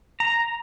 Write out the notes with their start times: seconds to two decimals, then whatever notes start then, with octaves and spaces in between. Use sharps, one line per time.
0.20 A#5